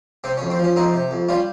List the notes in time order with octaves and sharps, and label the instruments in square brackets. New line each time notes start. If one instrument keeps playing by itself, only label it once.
[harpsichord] C3 C4
C#4
F2
C4
F3 C#4
F2 C4 D#4
C3
F2
G3 C#4 F4